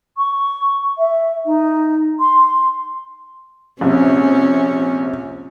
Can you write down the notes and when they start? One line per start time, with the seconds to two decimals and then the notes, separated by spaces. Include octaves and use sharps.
0.17 C#6
0.98 E5
1.45 D#4
2.19 C6
3.81 A#1 C3 C#4